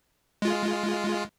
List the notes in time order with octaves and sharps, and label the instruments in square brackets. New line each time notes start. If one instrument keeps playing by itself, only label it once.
[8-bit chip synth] G#3 F4